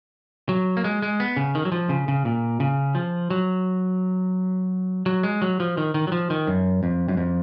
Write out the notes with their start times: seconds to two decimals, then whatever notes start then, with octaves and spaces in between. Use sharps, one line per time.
0.49 F#3
0.77 A#3
0.84 G#3
1.02 G#3
1.20 B3
1.37 C#3
1.55 D#3
1.65 F#3
1.72 F3
1.89 C#3
2.08 C#3
2.25 A#2
2.60 C#3
2.95 F3
3.30 F#3
5.06 F#3
5.23 G#3
5.42 F#3
5.60 F3
5.77 D#3
5.94 D#3
6.07 F#3
6.12 F3
6.30 D#3
6.47 F#2
6.83 F2
7.08 F#2
7.17 F2